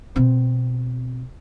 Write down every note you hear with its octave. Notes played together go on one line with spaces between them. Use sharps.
B2 C4